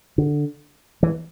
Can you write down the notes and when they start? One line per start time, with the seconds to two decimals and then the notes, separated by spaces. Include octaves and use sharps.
0.18 D3
1.03 E3